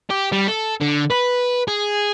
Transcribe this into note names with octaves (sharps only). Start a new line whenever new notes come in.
G4
G3
A4
D3
B4
G#4